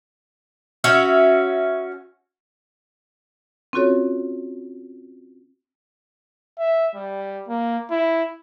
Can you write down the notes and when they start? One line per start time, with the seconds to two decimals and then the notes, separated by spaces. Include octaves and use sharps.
0.84 C#4 F#4 E5
3.73 C4 C#4 F4 F#4 A4 C#5
6.59 E5
6.95 G3
7.49 A#3
7.91 E4